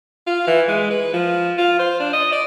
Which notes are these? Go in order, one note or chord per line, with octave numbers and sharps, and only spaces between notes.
F4
E3
G#3
B4
F3
F4
C5
D4
D#5
D5